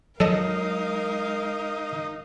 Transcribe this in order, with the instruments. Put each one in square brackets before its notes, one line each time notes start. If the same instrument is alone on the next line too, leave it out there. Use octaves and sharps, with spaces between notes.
[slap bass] F#3 [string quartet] G#3 A#4 F5 [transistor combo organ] D#4 [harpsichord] A4 D#5